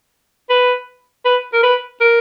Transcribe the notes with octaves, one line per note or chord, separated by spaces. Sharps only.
B4
B4
A#4
B4
A#4